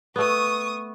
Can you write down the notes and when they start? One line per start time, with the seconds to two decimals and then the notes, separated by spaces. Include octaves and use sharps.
0.16 A3 B3 C#6 D#6